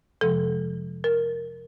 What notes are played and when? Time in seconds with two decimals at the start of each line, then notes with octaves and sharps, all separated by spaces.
0.21 F2 C3 F3 G#3 A4
1.04 A#4